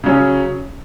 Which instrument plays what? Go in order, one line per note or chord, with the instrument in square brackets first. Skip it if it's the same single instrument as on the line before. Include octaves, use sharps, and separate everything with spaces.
[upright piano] C#3 F#3 C#4